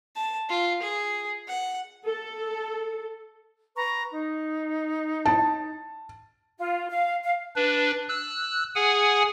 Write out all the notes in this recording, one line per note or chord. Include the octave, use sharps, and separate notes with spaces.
A5
F4
G#4
F#5
A4
B4 A#5 C#6
D#4
A5
F4
F5
F5
D4 B4
E6 F#6
G#4 F#5 G#5